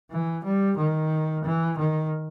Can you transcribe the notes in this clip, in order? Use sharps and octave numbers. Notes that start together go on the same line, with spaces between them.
E3
G3
D#3
E3
D#3